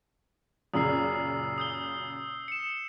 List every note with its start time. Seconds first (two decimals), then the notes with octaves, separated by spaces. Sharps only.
0.74 F#2 A#2 C#3 D#6 E6 C7
1.58 D#6 G6 G7
2.48 C#7 E7